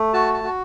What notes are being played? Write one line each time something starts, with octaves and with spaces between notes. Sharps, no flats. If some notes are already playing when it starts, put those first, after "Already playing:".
Already playing: A3
F#4 A5
A5
F#4